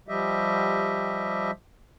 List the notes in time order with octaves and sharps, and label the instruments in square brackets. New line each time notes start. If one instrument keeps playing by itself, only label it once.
[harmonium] F3 G3 G4 D#5 E5